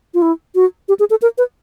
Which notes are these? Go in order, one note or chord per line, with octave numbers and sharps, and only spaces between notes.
F4
E4
F#4
G4
G#4
A4
A#4
B4